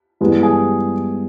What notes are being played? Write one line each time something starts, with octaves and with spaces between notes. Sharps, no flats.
G2 E3 G#3 B3
G#4